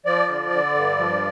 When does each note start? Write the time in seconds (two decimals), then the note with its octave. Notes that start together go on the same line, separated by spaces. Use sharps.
0.06 F3 D5
0.28 D3
0.51 D3
0.74 G2
0.98 F3